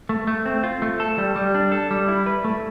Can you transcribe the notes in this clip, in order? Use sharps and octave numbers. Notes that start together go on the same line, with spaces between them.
A3
A3
C4
F4
A3
A4
G3
G3
D4
A4
G3
E4
B4
A3